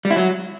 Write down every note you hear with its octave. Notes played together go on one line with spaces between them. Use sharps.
G3
E4
F#3